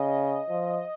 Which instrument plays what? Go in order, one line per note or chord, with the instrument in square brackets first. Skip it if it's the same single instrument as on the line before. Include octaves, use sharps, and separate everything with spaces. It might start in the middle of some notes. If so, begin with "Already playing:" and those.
Already playing: [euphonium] C#3 [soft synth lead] D#5
[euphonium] F3